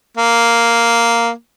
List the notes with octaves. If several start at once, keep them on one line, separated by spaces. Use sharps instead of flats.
A#3